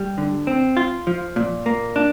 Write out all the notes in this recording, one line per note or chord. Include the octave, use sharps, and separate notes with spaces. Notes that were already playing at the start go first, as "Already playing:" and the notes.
Already playing: G3
D3
C4
F4
F3
A#2
A#3
D4